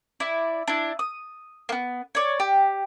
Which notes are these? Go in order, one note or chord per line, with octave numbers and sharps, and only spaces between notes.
E4 D5
D4 E4
D#6
A#3 B3
C#5 D5
G4